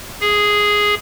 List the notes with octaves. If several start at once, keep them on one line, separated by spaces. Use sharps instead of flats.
G#4